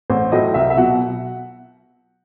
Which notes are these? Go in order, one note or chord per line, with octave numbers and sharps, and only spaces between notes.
A1 C5
A2 F#3 D#5
C2 E5
E5
B2 F#3 F#5